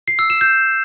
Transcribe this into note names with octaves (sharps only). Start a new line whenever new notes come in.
C7
E6
E7
G6